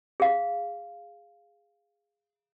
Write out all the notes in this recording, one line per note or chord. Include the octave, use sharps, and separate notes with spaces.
G#4 F5